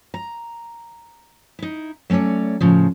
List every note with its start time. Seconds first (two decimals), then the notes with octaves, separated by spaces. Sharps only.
0.14 A#5
1.59 D#4 E4
2.10 F#3 A3 C#4 C#5 D5
2.61 A2 C#3 F3